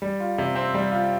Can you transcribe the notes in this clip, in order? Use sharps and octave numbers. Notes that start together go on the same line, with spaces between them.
G3
F4
C3
C4
G3
F4